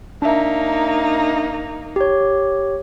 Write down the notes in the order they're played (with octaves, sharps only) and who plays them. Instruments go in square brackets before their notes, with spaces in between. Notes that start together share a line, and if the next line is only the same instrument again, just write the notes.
[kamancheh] A#3 D#4 [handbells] D4 E5
[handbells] G4 C#5